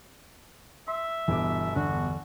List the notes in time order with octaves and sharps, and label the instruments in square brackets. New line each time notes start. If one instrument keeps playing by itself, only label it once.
[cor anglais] E5 [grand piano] C6
[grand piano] G1 B2 D6 [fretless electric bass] E3
[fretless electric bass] E2 D3 D4 [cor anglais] F#4